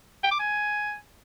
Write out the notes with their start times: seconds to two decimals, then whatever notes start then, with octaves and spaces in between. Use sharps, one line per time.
0.24 G5
0.31 D6
0.39 G#5